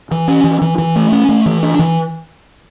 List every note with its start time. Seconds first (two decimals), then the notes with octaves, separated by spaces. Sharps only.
0.11 E3
0.28 C#4
0.44 E3
0.62 E3
0.78 E3
0.96 A3
1.12 C#4
1.29 A3
1.46 E3
1.63 D4
1.79 E3